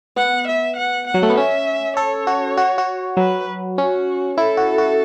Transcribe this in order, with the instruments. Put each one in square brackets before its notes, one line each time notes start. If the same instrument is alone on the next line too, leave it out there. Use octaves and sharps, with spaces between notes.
[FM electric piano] B3 [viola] F#5
[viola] E5
F#5
F#5
[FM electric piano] F#3
A3
B3
[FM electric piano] C#4 [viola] E5
[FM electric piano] A4 [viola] C#5
[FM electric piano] F#4
F#4
F#4
[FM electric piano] F#3 [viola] B4
[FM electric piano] C#4 [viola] F#4
[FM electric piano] E4 [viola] A4
[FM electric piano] F#4
F#4